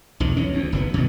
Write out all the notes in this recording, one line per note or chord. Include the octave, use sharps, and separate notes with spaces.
B1 E2 D#3
E3 C#4
D2
F#1 A#2 B3
B2 D#3 F#3